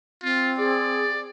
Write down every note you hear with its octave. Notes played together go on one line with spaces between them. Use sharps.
C4 F4
G#4 D5